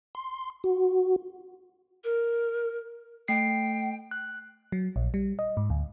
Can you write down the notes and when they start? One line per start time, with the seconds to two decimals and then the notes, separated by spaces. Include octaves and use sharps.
0.15 C6
0.64 F#4
2.04 A#4
3.28 A3 G5 C7
4.11 F#6
4.72 F#3
4.96 A#1
5.14 G3
5.39 D#5
5.57 G#2
5.70 D2